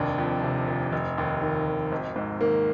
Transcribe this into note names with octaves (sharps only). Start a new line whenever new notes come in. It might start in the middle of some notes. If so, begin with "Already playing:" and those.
Already playing: F1 D#2 D4
F2
C3
F1
F1
D#2
D#3
F1
G#1
G#2
D#3 A#3